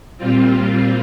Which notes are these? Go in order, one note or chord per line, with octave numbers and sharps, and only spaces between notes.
A#2 G3 C4 F4